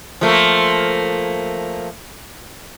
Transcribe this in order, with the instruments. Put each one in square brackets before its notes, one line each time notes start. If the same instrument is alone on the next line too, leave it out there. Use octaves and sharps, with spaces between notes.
[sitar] F3 A3 A#3